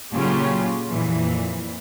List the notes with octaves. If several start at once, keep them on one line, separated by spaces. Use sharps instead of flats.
A#2 C#3 F#3 C#4 F4 G4
F2 A#2 E3